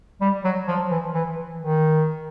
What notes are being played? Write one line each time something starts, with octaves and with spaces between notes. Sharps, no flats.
G3
F#3
F3
E3
E3
D#3